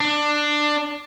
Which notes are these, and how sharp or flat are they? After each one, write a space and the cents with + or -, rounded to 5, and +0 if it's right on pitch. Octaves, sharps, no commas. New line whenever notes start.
D4 +15